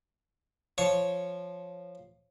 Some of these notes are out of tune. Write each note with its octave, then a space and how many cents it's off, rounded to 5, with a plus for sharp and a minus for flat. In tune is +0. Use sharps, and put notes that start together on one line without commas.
F3 +0 C#5 -5 C#6 +0